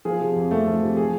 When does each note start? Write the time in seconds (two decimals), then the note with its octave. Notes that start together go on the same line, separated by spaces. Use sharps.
0.05 F3 G#4
0.20 C3
0.36 F2
0.51 F2 A3 A4
0.66 F3
0.82 C3
0.97 F3 G#4